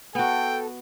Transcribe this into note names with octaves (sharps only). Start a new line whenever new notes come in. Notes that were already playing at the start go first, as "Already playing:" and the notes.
B3 F#4 A4 G5